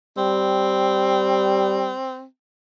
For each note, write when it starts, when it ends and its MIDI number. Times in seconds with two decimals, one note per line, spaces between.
0.17 1.94 55
0.17 2.25 60